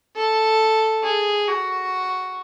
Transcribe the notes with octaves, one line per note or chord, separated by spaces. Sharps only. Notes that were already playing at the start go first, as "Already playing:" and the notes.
A4
G#4
F#4